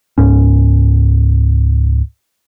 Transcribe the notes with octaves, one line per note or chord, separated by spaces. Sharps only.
C#2 G#2 C#4